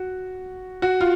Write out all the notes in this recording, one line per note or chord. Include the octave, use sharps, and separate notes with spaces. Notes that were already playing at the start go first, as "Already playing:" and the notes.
Already playing: F#4
F#4
F4